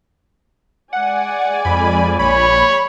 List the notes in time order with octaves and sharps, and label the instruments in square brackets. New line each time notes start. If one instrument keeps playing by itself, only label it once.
[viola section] G#3 D5 G#5 [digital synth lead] F#5
[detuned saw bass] F2 [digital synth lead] B5
[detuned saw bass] A#1 [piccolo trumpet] C#5 [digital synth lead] B5